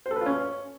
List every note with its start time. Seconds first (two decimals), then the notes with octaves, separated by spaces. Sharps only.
0.06 C5
0.11 A4
0.16 B4
0.21 F4
0.26 C#4